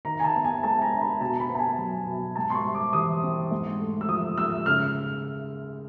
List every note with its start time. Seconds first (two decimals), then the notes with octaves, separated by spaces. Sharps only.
0.05 D#3 A#5
0.20 G#5
0.24 A5
0.35 B3
0.44 G#5
0.63 G#3 A5
0.82 A#5
0.91 D4
1.01 B5
1.20 B2 A5
1.40 B5
1.50 B3
1.55 A5
1.59 G#5
1.78 F#3
2.07 B2
2.36 G#2 A5
2.50 C6
2.55 C#6
2.65 G3
2.75 D6
2.93 E3 D#6
3.23 C4
3.51 G#2
3.80 A3
4.01 E6
4.09 F3 D#6
4.37 G#2 E6
4.66 C#3 F6